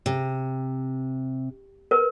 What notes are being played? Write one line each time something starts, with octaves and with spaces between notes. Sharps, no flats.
C3
A#4 B4